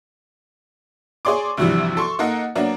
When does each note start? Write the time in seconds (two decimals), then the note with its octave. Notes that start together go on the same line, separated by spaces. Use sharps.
1.25 G#4 C#5 D5 C6 D6
1.57 D2 G2 C3 E3 F3 G3
1.97 A4 C6 C#6
2.19 A#3 D#4 A4 D#5 F#5
2.55 F#3 A#3 B3 D4